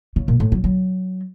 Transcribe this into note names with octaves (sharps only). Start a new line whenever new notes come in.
C#3
A#2
A2
F#3
F#3